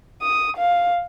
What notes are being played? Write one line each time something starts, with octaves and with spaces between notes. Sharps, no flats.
D#6
F5